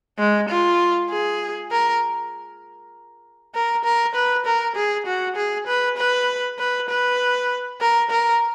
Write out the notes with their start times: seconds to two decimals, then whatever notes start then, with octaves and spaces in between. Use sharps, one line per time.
0.19 G#3
0.49 F4
1.10 G#4
1.71 A#4
3.54 A#4
3.84 A#4
4.15 B4
4.46 A#4
4.76 G#4
5.06 F#4
5.36 G#4
5.67 B4
5.97 B4
6.59 B4
6.89 B4
7.81 A#4
8.10 A#4